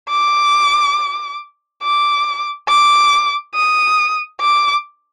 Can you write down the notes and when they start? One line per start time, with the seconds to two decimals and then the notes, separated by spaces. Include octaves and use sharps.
0.10 D6
1.83 D6
2.69 D6
3.54 D#6
4.41 D6